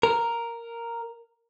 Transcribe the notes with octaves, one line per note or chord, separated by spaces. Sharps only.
A#4